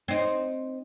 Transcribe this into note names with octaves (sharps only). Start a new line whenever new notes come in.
C4 D#4